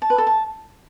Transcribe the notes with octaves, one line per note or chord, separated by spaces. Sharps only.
A5
B4
A4
A5